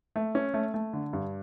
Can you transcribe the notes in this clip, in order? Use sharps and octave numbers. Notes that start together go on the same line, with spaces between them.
A3
C#4
A3
A3
D3
G2